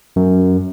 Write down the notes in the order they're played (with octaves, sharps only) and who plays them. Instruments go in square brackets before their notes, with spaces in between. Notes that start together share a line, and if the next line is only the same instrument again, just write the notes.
[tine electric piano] F#2